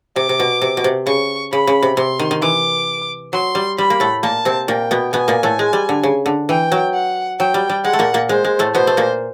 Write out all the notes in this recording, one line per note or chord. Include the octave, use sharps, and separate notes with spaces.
C3 D6
C3
B2
C3
B2
C3
C#3 C#6
C#3 B5
C#3
C3
C3 C6
D#3
D#3
E3 D6
F#3 C6
G3
G3 B5
A#3
A2 A3
A#2 A#3 A5
C3 C4
A#2 A#3 G5
B2 B3
B2 B3 G#5
A#2 A#3
A2 A3
G#3
G3
D3
C#3
D3
E3 G5
F#3
F#5
F#3 G5
G3
G3
G#3 F#5
A3
A#2 A#3
A#2 A#3
G#3 C5
G#3
A2 A3
B2 B3 C5
A3
A#2 A#3